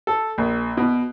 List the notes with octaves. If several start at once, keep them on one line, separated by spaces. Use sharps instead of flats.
A4
A#1
B2